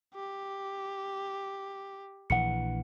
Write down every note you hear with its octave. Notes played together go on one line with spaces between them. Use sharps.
G4
A#1 E3 F#5 C#7